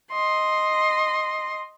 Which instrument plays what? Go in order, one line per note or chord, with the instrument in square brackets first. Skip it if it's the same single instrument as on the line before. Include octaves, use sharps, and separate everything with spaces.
[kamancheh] D#5 C6